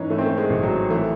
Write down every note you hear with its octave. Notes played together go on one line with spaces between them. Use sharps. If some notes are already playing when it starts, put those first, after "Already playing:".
Already playing: G#2 E3 C#4 D#4
E3 A3
C4
A3
G#3
A1
F#3
E3 A3